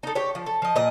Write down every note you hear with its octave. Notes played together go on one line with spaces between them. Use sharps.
D#4 A4
G4 C#5
F3
A4
F3 D#5
A#2 D#5